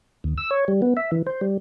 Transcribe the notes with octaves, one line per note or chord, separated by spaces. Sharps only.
D#2
E6
C#5
G3
B3
E5
E3
C5
G3